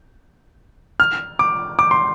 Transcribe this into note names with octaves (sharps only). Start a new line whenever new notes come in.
F6
D6
D6
C6